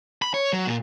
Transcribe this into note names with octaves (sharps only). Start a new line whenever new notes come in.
B5
C#5
F#3
A#2